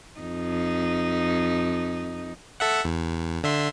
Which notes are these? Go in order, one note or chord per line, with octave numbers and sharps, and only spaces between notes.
F2 D#4
A4 E5 F#5
E2
D3 E5 C6